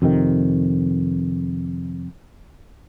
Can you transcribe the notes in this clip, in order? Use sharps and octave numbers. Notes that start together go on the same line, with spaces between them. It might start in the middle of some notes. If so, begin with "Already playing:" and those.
F2 C3 D#3